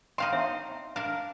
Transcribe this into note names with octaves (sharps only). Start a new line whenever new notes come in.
C4 D4 D#4 F5 C6
E5
D4 A#4 F5